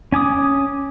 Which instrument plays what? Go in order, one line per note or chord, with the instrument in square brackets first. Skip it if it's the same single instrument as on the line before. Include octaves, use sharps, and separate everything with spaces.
[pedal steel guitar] C#4 G#5 D6 D#6